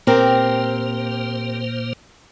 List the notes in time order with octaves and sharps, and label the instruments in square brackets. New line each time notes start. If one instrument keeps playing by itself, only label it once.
[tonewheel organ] A#2 A#3 C5 [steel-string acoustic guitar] C4 G4 A#4